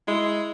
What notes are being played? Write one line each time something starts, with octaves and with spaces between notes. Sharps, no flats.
G#3 E4